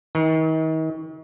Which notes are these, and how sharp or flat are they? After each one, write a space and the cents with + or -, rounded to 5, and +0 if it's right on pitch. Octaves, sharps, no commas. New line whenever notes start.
D#3 +40